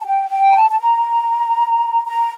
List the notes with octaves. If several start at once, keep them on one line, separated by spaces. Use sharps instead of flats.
A5
G5
G5
A#5
A5
A5
A#5
A#5